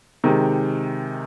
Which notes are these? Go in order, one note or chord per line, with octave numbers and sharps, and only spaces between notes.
C3 D#3 G#3